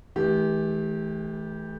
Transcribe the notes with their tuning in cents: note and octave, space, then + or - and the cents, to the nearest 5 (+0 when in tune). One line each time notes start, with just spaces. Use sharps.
E3 -40 A3 -40 G4 +0